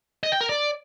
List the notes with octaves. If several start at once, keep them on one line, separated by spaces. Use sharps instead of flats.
D#5
G5
A#4
D5